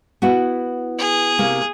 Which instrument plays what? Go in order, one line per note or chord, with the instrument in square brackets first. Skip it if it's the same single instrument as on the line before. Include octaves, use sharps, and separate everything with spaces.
[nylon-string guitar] B3 E4 F#4
[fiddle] G#4
[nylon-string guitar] C3 A#3